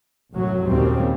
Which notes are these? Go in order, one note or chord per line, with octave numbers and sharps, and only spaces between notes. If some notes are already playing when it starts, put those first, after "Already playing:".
C2 F#2 A2 F#3
D#2 A#2 C#3 G3 C4